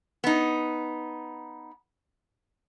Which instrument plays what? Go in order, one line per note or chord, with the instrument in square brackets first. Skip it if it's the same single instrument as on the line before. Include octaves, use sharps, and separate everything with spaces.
[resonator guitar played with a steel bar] B3 D#4